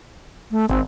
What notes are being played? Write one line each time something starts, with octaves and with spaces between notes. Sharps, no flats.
A3
G#1 C4